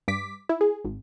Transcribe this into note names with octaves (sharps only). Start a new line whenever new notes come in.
G2 D6 B6
E4
G#4
G#1